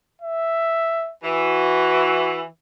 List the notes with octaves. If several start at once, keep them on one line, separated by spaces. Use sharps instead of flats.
E5
E3 F#4